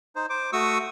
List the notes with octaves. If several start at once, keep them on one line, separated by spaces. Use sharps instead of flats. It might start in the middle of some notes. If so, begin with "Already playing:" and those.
D#4 C5
C5 D6
A3 F#4 C#6 D#6 E6